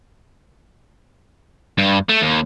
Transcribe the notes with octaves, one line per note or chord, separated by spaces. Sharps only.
G2
A3
D#2